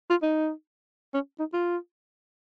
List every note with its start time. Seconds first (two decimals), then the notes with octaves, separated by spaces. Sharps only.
0.10 F4
0.22 D#4
1.14 C#4
1.39 D#4
1.53 F4